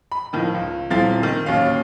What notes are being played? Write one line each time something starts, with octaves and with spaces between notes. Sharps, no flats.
B5
A2 D#3 F3
C#2
D#1 C4 E4 F5 A6
D#3
D1 D#2 C#4 F5